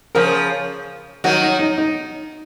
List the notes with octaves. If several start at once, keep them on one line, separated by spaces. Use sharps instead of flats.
C#3 F3 A#4
D#3 F#3 F#4
D#4
D#4
D#4